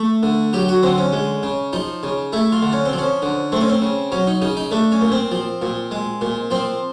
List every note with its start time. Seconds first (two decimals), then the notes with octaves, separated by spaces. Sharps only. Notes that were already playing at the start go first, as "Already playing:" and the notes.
Already playing: A3
0.23 D3
0.53 F#3 G4
0.69 F#4
0.83 D3 C4
0.98 C#4
1.13 G#3
1.43 C#3
1.73 F3 D#4
2.03 C#3
2.33 A3 E4
2.52 F4
2.62 D3
2.72 C#4
2.85 C4
2.93 F3
2.98 C#4
3.22 D3
3.52 A3 C4
3.61 C#4
3.69 C4
3.82 C#3
4.12 F#3 C#4
4.27 D#4
4.42 C#3 D#4
4.57 D#4
4.71 A3 D4
4.92 C#4
5.01 A#2
5.12 C4
5.31 F3
5.62 A#2
5.91 G#3
6.21 A#2
6.51 F3 C4